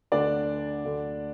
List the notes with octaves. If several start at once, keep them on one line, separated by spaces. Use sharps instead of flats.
D2 D3 D4 D5
D2 D3